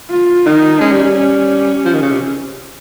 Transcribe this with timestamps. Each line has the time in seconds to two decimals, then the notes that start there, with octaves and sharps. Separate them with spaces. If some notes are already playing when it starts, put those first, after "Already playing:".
0.10 F4
0.45 D#3 D#4
0.80 G#3 C#4
0.92 G3
1.03 G3
1.15 C#4
1.85 F3
1.94 D#3
2.02 C#3
2.11 C3